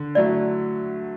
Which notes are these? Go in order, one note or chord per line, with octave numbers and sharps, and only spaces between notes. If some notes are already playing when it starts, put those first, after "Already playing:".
Already playing: D3
F#3 A3 E4 D5